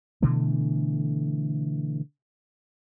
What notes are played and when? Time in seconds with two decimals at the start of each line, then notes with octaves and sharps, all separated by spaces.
0.22 B2 D3 E3 A3